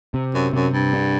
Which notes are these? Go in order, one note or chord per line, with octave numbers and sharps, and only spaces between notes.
C3
F#2
F#2 C3
G2
D4